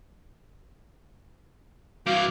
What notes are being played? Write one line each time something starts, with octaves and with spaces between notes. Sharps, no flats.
G2 E3 F#4 F5 D6 G6